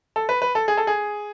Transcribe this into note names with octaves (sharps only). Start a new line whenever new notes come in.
A4
B4
B4
A4
G#4
A4
G#4